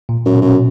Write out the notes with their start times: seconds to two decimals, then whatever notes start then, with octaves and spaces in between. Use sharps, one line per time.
0.09 A#2
0.26 F#2
0.34 B2
0.42 F#2